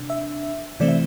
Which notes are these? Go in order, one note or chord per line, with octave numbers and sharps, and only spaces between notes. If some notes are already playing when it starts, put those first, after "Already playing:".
Already playing: C3 D4
E5
C3 E3 A3 C4 D5
E5